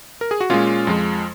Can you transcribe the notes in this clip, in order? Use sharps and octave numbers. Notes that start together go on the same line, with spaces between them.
A#4
G#4
F#4
A#2 G#3 C#4 F4
F2 F3 G#3